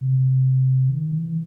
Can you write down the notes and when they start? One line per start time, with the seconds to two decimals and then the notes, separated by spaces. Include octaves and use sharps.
0.01 C3
0.89 D#3
1.12 E3